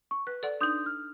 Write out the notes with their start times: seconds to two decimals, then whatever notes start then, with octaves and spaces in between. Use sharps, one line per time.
0.11 C#6
0.27 B4 F#6
0.43 A4 D5 F#5
0.61 D4 D#4 C6 D#6 G6
0.86 F6